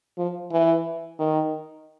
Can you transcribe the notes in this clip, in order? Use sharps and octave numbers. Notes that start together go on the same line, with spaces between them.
F3
E3
D#3